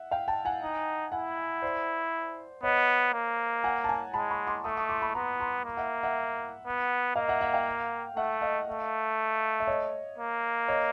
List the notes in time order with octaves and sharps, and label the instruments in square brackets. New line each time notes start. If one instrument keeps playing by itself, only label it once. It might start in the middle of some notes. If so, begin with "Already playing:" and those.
Already playing: [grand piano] E5 F#5
F5 G5
G5 A5
F#5 G#5
[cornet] D#4
[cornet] E4 [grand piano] F#5 G#5
[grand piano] C5 D5
[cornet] B3 [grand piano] C#5 D#5
[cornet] A#3
[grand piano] F#5 G#5
A5
G#5 A#5
[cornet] G#3 [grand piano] A5 B5
[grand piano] B5 C#6
C6 D6
[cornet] A3 [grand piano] C#6 D#6
[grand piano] C#6 D#6
C6 D6
B5 C#6
[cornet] B3 [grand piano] A#5 C6
[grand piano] A#5 C6
[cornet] A#3
[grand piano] E5 F#5
E5 F#5
[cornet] B3
[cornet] A#3 [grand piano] D#5 F5
[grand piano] E5 F#5
E5 F#5
F5 G5
[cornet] A3 [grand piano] E5 F#5
[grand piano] D#5 F5
[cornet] A3
[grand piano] E5
C#5 D#5
[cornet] A#3
[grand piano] C#5 D#5